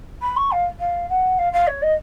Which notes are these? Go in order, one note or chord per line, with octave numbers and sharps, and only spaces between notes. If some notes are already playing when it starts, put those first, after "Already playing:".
B5
C#6
F5
F5
F#5
F5
F5
C#5
D#5